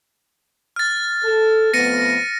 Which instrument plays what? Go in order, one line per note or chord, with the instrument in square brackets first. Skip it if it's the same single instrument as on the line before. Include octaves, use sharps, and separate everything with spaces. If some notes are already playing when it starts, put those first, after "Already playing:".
[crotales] F6 A6
[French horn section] A4
[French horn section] F2 A3 B3 [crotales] A#6 C#7 D#7